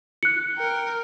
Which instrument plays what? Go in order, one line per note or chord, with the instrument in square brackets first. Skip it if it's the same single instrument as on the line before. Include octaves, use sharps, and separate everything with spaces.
[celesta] F#6 C#7
[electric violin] A#4 G5